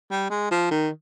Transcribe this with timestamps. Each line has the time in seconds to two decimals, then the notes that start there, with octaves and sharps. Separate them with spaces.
0.11 G3
0.31 G#3
0.51 F3
0.71 D#3